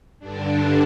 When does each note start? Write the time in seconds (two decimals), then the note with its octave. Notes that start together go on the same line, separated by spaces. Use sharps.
0.19 G2 D3 D4